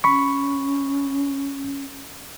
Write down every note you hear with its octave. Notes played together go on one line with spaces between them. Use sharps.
C#4 B5 C#6